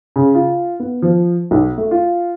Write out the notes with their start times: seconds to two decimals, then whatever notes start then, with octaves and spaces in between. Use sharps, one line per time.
0.16 C#3
0.35 F4
0.80 B3
1.02 F3
1.51 B1
1.78 A3
1.91 F4